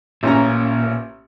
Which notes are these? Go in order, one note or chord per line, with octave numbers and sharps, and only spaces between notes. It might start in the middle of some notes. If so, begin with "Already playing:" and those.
A1 A#2 C#4 A#5